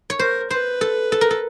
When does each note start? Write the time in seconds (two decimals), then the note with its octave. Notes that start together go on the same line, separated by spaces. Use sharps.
0.10 C#5
0.19 A#4 C5
0.50 B4 C5
0.81 A4
1.12 A4
1.21 A#4
1.31 A4